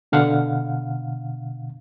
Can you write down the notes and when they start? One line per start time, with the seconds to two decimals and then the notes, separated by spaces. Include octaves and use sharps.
0.12 B2 D3 F5 F#5